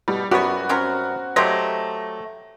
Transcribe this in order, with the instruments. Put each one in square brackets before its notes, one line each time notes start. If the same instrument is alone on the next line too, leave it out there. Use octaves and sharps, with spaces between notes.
[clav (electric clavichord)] B2 [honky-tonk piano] G3
[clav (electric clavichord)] F#2 G3 B3 [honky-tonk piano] F#4 [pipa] G4 C#5
[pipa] C4 C#4 A#4
[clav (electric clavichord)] F#3 G4 [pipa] A3 C5 D#5 [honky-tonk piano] A#6